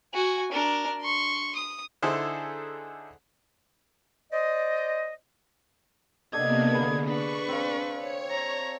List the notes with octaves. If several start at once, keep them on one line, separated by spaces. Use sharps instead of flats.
F#4 G#5
D4 A#4
C6 C#6
D#6
D3 D#4 E4 G#4 A4 C5
C5 D5 D#5
C3 A#3 B3 D4 A4 D#5 G#6
D3 G#4 B5
D4 B4 C#6
C4 F5
C#5
A#5